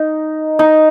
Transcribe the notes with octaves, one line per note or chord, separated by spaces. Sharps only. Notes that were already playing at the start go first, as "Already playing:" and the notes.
Already playing: D#4
D#4